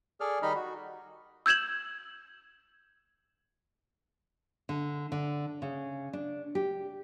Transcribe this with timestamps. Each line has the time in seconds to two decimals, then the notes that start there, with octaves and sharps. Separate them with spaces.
0.20 G#4 A4 D5 F6
0.42 D#3 G3 D#4 D#5 B5 F6
0.55 F#4
1.46 E6 G6 G#6 E7 F#7
4.69 D3
5.12 D3
5.62 C#3
6.13 D4
6.55 G4